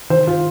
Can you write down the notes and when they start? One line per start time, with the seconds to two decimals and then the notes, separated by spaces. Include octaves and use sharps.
0.10 D#3 C5
0.27 F4